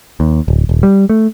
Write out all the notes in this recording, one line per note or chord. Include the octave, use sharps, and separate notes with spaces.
D#2
D1
D#1
G3
A3